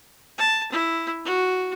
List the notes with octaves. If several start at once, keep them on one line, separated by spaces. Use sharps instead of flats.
A5
E4
F#4